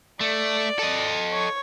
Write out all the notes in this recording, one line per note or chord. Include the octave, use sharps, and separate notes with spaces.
A3 D5
A4 D#5
C#5